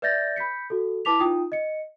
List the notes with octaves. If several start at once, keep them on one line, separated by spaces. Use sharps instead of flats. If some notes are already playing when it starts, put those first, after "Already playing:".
B4 D5 E5 G6 A6 A#6
B5 G6 B6 C#7
F#4 A4
E4 B4 A5 D6 B6 F7
D#4 F4 G5 D#6
D#5 C#7